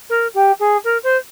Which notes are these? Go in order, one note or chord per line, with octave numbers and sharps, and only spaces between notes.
A#4
G4
G#4
A#4
C5